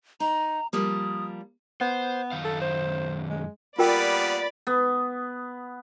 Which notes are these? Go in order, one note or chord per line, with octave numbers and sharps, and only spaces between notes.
D#4 A#5
F3 G3 A#3 D#6
B3 C5
F#2 D#3 F5
A4
C5
G#3
G3 A#3 B3 F4 A#4 D5 G5 B5
B3